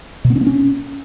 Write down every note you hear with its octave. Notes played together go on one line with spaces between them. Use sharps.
B2
B3
C#4
B3
C#4